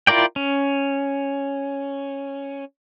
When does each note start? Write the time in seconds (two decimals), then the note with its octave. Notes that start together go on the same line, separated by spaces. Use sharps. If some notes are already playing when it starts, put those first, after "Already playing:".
0.07 E4 F4 A#4 D5 G5
0.36 C#4